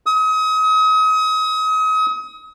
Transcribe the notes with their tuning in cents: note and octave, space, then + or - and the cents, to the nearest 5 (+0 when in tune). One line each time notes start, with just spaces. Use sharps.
D#6 +35